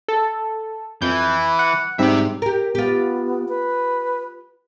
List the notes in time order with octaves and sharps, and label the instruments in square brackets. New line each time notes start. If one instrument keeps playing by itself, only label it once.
[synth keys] A4
[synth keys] F2 G6 [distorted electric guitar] E3
[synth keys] F#5
[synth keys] G#2 G3 C4 [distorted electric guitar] G4 E5
[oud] G4 A#4
[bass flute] B3 [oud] F4 G4
[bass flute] B4